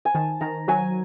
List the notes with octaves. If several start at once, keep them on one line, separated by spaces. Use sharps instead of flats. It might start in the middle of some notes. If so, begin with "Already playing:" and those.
G#5
D#3 A5
D#3 A#5
F#3 G#5